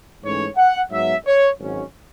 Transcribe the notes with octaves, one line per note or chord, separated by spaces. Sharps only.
G#2 E3 A3 C#4 C#5
F#5
G#2 F#3 B3 E5
C#5
G#1 G#2 F#3 C#4